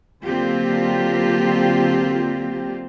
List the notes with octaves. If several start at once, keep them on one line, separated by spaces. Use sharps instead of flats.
D3 F#3 A#3 C4 F4 G4